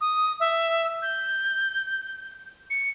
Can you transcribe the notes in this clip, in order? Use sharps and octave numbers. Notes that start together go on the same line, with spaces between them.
D#6
E5
G6
C#7